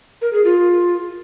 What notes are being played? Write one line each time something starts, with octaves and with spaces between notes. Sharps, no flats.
A#4
G#4
F4